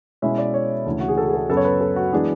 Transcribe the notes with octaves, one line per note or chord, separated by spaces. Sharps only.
B2 G#3 C#4 E4 E5
D5
C#5
D2 C#3 E3
F#4
G#4
A4
G#4
A4
F#2 C#3 F#3 B3 A4
C#5
B4
A4
F#4
E3 G#3 B3 D4 G#4